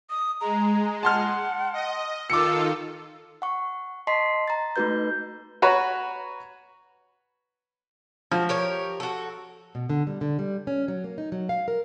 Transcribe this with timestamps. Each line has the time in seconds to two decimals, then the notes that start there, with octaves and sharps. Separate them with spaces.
0.10 D#6
0.41 G#3 A#5
1.03 F#5 A5 C6 F6
1.73 D#5
2.30 D#3 F4 A4 D6 E6 C#7
3.42 F#5 C#6
4.07 D#5 A5 C6 B6 C7
4.48 A#5 A6
4.76 A3 D#4 F#4 B4 G6
5.62 F#4 B4 C#5 A#5
8.32 F3 F#4
8.49 G4 A#4 C#5
9.00 F#4 A4
9.75 B2
9.90 D3
10.07 G3
10.21 D3
10.39 G3
10.67 C#4
10.88 F#3
11.04 A#3
11.18 D#4
11.32 F#3
11.49 F5
11.68 A#4